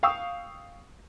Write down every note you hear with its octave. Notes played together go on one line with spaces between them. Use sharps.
F5 G5 C#6 D#6 E6